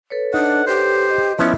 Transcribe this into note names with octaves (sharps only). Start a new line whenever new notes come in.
A4 B4 C#5
D4 D#4 F#5
G4 C5
D#5
F3 B3 C#4 E4